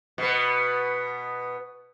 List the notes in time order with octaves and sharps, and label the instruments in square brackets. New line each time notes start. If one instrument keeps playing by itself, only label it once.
[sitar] B2 B3